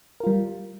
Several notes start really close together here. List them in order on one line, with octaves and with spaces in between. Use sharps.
A#4 F4 G3